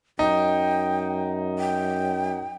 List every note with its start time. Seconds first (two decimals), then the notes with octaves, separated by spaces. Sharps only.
0.19 F#2 D#4 G5
1.59 G5